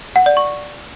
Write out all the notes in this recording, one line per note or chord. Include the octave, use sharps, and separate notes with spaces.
F#5
D5
C#6